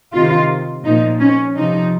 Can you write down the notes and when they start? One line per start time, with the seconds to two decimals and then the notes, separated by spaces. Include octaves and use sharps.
0.14 C3 D#3 F4
0.85 A#2 F3 D#4
1.20 C#4
1.56 C3 F3 D#4